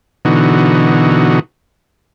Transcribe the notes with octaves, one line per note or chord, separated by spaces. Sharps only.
B2 D3 E3 D#4 F#4